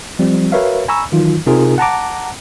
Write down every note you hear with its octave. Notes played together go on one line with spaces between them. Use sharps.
F3 G3 C4
F#4 A#4 B4 C#5 E5 F5
G#5 A#5 B5 C#6 E6
D#3 E3 F#3 D#4 F4
C3 C4 D#4 F4 G#4 A#4
F#5 A5 A#5 D6